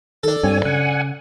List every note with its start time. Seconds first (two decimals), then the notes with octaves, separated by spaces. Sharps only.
0.23 D#3 D4 A4
0.43 G2 C4 C#5 G#5
0.65 C#3 F#5 G#5